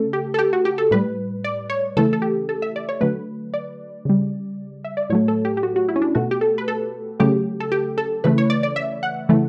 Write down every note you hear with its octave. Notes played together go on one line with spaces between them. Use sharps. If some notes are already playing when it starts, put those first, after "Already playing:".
Already playing: C#3 A3 A4
G4
A4
G4
F#4
G4
A4
A2 G3 B4
D5
C#5
C#3 E3 A3 A4
A4
G4
A4
E5
D5
C#5
D3 F#3 A3 B4
D5
C#3 G3
E5
D5
A2 F#3 A3 C#5
A4
G4
G4
F#4
F#4
E4
C#4
D4
B2 A3 F#4
G4
A4
B4
A4
C#3 F#3 A3 G4
A4
G4
A4
C#3 E3 A3 B4
C#5
D5
D5
E5
F#5
C#3 E3 A3